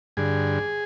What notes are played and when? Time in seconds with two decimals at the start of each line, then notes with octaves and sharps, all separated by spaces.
0.17 G2 D3 G#4